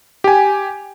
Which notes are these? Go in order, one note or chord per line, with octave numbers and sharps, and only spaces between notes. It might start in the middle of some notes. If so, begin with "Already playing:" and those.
G4 G#5